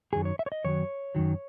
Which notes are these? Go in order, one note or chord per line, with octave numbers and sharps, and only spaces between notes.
F#2 D#3 F#3 G#4
C#5
E5
C#5
D#5
F#2 D#3 F#3 C#5
F#2 D#3 F#3